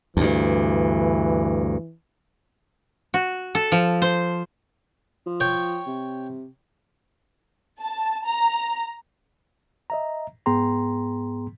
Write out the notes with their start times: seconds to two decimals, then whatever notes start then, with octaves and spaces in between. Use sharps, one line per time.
0.17 D2 G2 E3
3.14 F#4
3.55 A4
3.72 F3
4.02 C5
5.26 F3
5.40 C#5 G5
5.87 C3
7.80 A5
8.26 A#5
9.90 D#5 E5 A#5
10.46 G#2 B3 G#4 G5 A#5 C6